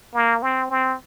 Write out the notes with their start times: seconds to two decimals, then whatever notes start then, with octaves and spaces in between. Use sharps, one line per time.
0.14 A#3
0.42 C4
0.70 C4